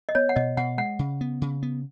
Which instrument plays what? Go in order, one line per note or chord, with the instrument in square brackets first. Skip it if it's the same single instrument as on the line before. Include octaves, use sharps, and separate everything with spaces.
[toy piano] D#5
[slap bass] B3 [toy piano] C#5
[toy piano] F#5
[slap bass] B2 [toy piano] D#5
[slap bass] B2 [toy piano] F#5
[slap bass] G#3 [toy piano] F#5
[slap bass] C#3
B3
C#3
B3